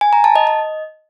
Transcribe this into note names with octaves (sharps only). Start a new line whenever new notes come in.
G#5
A#5
A5
D#5
D#5